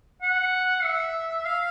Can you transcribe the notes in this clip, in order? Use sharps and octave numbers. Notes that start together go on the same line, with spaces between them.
F#5
E5
F5